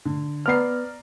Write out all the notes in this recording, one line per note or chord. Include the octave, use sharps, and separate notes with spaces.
D3
B3 D5 A#5 F6 C7